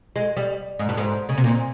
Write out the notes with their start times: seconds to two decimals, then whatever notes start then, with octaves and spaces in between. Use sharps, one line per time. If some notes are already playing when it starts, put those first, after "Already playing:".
0.16 G#3
0.37 G3
0.79 G#2
0.89 G2
0.97 G#2
1.29 C#3
1.38 C3
1.44 A#2